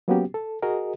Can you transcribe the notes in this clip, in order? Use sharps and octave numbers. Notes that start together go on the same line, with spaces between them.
F#3 A#3 B3 C#4 F#4 G4
A4
F#4 G#4 A#4 D#5